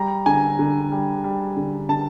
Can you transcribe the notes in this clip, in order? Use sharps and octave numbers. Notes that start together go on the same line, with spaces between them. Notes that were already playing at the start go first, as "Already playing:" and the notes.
Already playing: G3 A#5
D3 G#5
D3
G3
G3
D3
D3 A5